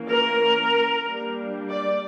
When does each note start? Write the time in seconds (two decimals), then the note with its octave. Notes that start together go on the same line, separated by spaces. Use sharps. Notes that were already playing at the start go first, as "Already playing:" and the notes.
Already playing: E3 A#3 C#4
0.08 A#4
1.04 G3 A#3 D4
1.69 D5